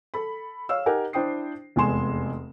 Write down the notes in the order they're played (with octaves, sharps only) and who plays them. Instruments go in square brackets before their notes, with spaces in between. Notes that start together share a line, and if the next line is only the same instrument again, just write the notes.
[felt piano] A4 B5
C#5 F5 E6
D#4 G4 A#4 F#5 G#5
D4 E4 C5 G5 D#6 C7
F1 E2 G#3 G#5 C6 E7